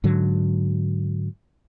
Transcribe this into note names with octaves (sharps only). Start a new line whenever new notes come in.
G#2 D3 F#3